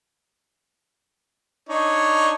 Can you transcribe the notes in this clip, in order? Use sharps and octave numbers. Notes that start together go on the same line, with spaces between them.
D4 D#4 C#5